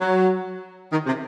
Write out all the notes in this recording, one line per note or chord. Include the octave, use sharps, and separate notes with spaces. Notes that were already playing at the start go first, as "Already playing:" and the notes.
F#3
D#3
C3